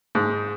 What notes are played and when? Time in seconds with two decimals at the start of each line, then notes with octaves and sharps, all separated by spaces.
0.15 G#2